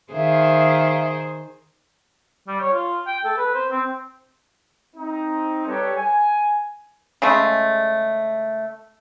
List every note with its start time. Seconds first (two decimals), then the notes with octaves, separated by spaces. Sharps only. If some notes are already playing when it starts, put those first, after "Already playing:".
0.12 D#3 G#4 C5 E5 F5
2.48 G3
2.61 C#5
2.73 F4
3.07 G5
3.25 A4
3.37 B4
3.54 C5
3.71 C4
4.96 C4 D#4
5.67 G3 G4 A4 B4 C#5
5.96 G#5
7.22 C#3 G#3 A3